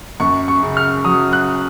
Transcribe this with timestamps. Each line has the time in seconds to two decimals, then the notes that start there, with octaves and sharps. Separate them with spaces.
0.20 F#2 C#6
0.48 C#6
0.63 C#3
0.77 F6
1.05 F#3 D#6
1.33 F#6